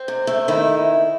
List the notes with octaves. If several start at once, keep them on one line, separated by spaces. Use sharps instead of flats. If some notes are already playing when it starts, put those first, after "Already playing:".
Already playing: C4
C3
A3
D#3 E4